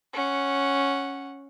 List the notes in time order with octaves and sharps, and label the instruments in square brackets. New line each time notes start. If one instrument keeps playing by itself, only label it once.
[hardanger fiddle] C#4 F#5